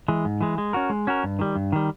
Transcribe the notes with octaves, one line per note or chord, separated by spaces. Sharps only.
E3 G#3
G#2
E3 G#3
G#3
C#4 F#4 A#4
G#3
C#4 F#4 A#4
G2
D#3 G3
G2
D#3 G3